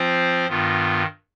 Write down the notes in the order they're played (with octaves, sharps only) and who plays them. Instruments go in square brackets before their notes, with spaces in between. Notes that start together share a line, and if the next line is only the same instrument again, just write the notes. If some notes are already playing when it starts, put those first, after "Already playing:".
Already playing: [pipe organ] F3 C4 F4 C5
G2 D#3 B3 F4